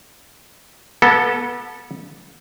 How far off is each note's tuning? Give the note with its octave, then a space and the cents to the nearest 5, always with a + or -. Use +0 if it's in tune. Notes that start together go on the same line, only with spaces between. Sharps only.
B3 -30 A4 +0